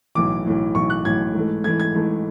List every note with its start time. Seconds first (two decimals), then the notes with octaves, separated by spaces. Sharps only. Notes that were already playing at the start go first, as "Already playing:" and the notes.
0.15 B1 A2 E3 D6
0.45 B1 A2 E3
0.75 B1 A2 E3 C#6
0.90 F#6
1.05 B1 A2 E3 G#6
1.34 G#2 E3 A3
1.64 G#2 E3 A3 G#6
1.80 G#6
1.94 G#2 E3 A3